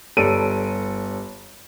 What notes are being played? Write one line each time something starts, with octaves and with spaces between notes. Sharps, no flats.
G1 G3 A4 C#5 D7 D#7